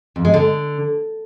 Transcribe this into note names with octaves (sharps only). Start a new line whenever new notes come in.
F2
G#3
D3